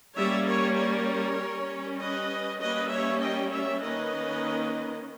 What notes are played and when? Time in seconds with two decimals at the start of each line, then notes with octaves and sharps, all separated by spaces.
0.16 G3 A#3 C#4 C#5 E5
0.46 A#4 C#5
0.77 A#4 C#5
1.38 G3 C#4
1.99 B4 D#5
2.60 G3 A#3 C#4 B4 D#5
2.90 C#5 E5
3.21 D#5 G5
3.51 C#5 E5
3.81 D#3 A#3 C#4 B4 D#5